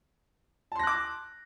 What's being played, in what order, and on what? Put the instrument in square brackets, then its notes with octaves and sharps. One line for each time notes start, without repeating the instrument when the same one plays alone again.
[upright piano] A5
C6
A#6
F#6
D6